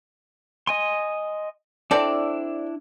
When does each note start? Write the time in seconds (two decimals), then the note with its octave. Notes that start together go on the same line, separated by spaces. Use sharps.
0.67 D#5 G#5 C6
1.91 C4 D4 E4 A4 D5